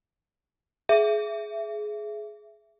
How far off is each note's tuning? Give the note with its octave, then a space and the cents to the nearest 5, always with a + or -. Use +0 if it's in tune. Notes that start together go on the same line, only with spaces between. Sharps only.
G#4 +20 E5 +20